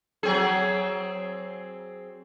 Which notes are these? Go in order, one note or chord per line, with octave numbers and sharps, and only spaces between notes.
F#3 C4 G#4